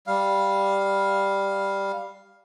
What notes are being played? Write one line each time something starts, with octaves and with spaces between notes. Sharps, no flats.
G3 F5